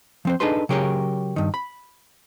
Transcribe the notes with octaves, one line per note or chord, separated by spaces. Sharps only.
F3 C4 C5
D4 D#4 G#4 A4 B4 C6
C#3 F#3 G4 G#4 A#4 C#5
G2 D#3
B5